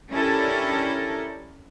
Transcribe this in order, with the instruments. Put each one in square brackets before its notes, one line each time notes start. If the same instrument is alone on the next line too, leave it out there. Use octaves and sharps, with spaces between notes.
[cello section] C#4 D4 E4 G4 A4 A#4